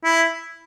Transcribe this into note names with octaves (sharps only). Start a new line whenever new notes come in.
E4